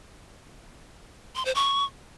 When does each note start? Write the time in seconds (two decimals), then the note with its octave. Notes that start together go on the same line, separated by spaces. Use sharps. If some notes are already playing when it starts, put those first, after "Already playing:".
1.35 C6
1.45 C5
1.55 C#6